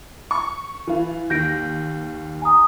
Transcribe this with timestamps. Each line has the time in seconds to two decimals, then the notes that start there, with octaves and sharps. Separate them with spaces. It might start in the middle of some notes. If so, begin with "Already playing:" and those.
0.31 C#6
0.87 E3 F4
1.30 D#2 G6 A#6 D7
2.42 G#5 A#5 D#6